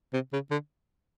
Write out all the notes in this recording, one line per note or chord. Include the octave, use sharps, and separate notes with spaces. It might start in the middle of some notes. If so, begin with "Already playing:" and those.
C3
C#3
D3